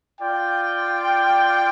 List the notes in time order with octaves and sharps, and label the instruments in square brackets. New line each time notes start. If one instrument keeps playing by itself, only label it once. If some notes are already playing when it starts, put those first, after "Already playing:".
[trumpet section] F4 D5 G5